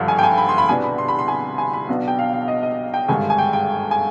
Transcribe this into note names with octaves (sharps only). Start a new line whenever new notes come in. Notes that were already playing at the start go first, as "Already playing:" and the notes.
Already playing: G#1 G2 D3 F3 B5
G#5
G5
G#5
B5
C6
B5
C2 B2 B3 D4 G#5
B5
C6
B5
C6
G#5
G#5
B5
B1 B2 B3 D4
G5
F5
F5
D#5
D#5
G5
G#1 G2 D3 G#3 G#5
G#5
G5
G5
G#5